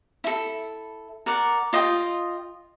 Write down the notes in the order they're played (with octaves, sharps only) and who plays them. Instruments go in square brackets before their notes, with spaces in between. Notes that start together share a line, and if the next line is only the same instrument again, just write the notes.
[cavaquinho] E4 A4
A#4 D5 F#5
F4 D#5 G5